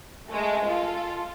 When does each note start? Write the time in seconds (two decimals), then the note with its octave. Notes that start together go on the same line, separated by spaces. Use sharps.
0.28 G#3 A3
0.65 F4 A4